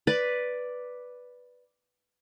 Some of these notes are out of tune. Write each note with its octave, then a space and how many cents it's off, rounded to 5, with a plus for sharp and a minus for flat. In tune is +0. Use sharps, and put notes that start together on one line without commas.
B4 +0 D5 +0